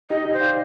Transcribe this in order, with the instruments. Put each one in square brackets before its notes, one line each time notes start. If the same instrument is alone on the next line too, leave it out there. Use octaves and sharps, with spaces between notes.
[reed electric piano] D#4 G4 [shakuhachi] D#5
[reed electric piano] D#4 G4
[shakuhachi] C5
[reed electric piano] D5 F5